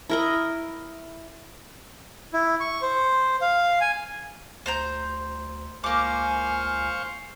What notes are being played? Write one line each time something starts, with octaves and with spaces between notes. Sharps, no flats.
E4 A#4 D#5
E4
C#6
C5
F5
G#5
D2 C5 A#5 G6
C#2 A#3 C5 F5 G#5 C#6 D6